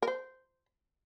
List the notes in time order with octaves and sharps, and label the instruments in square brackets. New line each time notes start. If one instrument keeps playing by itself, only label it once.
[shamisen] A#4
C5